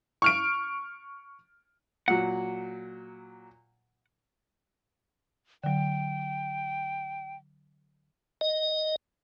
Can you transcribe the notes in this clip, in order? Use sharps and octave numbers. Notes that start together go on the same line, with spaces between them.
C#6 F6 D7
A#2 F#3 F#5
D3 F#3 G5
D#5